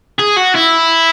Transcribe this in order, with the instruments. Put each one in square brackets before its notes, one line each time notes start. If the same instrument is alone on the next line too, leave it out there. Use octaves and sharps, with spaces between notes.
[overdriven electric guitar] G#4
F#4
E4